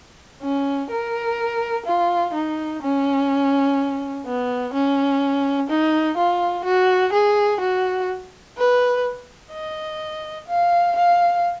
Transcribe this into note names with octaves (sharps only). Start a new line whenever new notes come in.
C#4
A#4
F4
D#4
C#4
B3
C#4
D#4
F4
F#4
G#4
F#4
B4
D#5
F5
F5